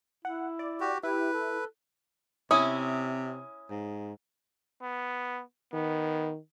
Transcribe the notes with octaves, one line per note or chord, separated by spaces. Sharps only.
E4 F#5
D5
F#4 G4
E4 G4 B4
A4
C3 C#4 E4 D#6
G#2
B3
D#3 B3